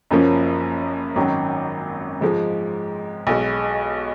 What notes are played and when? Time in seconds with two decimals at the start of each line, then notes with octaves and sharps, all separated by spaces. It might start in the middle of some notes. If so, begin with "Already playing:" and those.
0.11 F#1 F#2 F3 A#3 C#4
1.16 G#1 F#2 D#3 F#3
2.21 G#2 F3 G#3
3.27 B1 B2 G#3